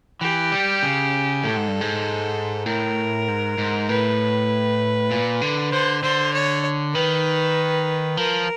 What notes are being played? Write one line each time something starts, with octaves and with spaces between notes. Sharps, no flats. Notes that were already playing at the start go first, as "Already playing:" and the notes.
E3 G4
G3
C#3
A2 A4
G#2
G2
G#2
A2 A#4
G#2
G#2
A2 B4
A#2
D3
D3 C5
D3 C5
C#5
D#3 B4
F3 A#4